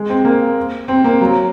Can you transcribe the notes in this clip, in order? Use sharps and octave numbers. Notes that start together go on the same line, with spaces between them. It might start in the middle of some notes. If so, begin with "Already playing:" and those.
Already playing: G#3
C4
A#3
C4
A#3
F#3